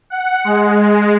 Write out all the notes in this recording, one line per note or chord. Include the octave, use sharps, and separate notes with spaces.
F#5
G#3